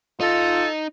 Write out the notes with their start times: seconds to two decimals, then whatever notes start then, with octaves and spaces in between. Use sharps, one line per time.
0.21 D#4 F4 A4